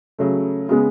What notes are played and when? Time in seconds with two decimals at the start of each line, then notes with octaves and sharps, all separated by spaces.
0.19 C#3 F#3 A3
0.69 C#3 G#3 B3